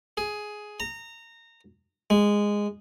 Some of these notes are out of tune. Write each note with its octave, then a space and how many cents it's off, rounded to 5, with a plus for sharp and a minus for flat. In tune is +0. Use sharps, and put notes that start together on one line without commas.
G#4 +10
A#5 -20
G#3 -10